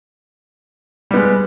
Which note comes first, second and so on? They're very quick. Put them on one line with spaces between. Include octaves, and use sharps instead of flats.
G3 B3 G#3